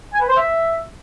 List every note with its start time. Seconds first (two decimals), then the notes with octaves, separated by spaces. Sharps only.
0.12 G#5
0.20 B4
0.28 C5
0.36 E5